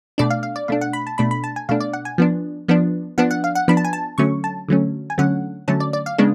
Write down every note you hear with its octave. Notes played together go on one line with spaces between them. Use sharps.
B2 A3 D4 D5
F5
F5
D5
B2 A3 D4 F5
F#5
B5
A5
B2 A3 D4 B5
B5
A5
G#5
B2 A3 D4 F5
D5
F#5
G#5
F3 B3 D4
F3 B3 D4
F3 B3 D4 F#5
F#5
F5
F#5
F3 B3 D4 B5
A5
G#5
A5
D3 F#3 A3 C#4 C#6
A5
D3 F#3 A3 C#4
G#5
D3 F#3 A3 C#4 F#5
D3 F#3 A3 C#4 A5
D5
D5
F5
C#3 G#3 B3 D4